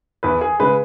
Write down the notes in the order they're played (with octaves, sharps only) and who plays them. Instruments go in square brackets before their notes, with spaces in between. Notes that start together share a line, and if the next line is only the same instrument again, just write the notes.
[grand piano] E2 B4
G#4
C#3 G#3 B4